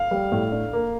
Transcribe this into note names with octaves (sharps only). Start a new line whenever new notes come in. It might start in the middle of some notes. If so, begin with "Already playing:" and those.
Already playing: F5
G3
A2
D4
A#3